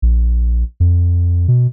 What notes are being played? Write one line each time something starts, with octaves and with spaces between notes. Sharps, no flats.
A#1
F2
B2